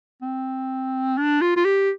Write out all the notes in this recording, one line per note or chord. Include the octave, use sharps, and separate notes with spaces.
C4
D4
F4
F4
G4